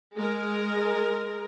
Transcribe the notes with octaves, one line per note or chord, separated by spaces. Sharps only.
G#3 A#4